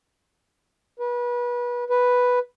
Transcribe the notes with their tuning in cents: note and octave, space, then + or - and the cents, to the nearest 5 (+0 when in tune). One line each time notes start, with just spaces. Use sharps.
B4 -30
B4 +0